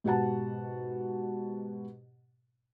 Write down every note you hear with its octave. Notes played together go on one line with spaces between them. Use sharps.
G#2 B2 G4 F#5 A5